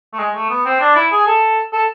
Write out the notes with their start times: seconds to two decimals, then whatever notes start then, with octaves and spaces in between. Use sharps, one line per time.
0.13 A3
0.19 G#3
0.34 A3
0.50 B3
0.65 C4
0.80 D4
0.95 E4
1.12 G#4
1.26 A4
1.73 A4